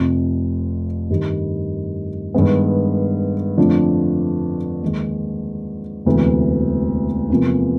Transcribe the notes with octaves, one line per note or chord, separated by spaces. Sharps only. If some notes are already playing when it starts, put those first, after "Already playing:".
Already playing: F1 F2 C3
G2 D#3 G3
G2 D#3 G#3 B3
F2 D3 F3 A3 D4
D#2 D#3 G#3
E1 D2 C3 E3
E2 C3 F3 A#3